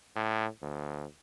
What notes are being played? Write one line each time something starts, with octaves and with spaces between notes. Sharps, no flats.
A2
D2